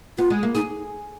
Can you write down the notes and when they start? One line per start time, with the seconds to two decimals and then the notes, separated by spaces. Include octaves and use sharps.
0.18 B3 F4
0.30 G#3
0.43 A#3
0.55 D#4 G#4